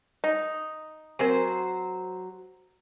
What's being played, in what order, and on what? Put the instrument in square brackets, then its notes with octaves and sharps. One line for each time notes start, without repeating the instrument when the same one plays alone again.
[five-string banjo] D#4
[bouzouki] F#3 C5 [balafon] C4 A#4 G#5